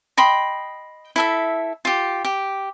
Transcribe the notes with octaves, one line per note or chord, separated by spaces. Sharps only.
D#5 G5 B5 C6
E4 A4 E5
F4 G4
G4